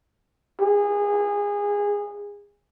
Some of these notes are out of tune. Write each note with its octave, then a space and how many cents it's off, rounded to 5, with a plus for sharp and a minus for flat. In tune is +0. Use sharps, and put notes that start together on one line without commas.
G#4 -25